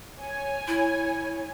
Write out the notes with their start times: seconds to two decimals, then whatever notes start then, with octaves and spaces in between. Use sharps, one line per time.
0.19 C#5 G#5
0.68 E4